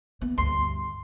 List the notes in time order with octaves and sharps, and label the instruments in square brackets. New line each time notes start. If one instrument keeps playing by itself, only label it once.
[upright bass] B3
[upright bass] D2 G2 [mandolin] C6